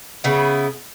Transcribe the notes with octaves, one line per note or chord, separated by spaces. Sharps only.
C#3 B3 E4